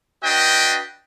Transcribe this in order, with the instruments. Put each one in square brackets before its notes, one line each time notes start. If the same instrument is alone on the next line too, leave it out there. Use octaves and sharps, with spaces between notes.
[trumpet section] D4 F#4 B4 D#5 G5